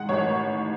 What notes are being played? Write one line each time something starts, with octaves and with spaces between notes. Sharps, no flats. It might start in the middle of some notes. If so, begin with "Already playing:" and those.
Already playing: D#3 G#3 F#5
A1 C#5